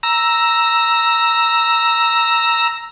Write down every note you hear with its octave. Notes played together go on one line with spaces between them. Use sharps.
A#5 E6